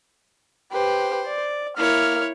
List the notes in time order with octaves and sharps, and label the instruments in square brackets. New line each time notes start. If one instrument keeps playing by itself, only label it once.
[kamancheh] G4 B4 [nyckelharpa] C5
[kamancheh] D5
[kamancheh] A#3 F6 [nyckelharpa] E4 C#5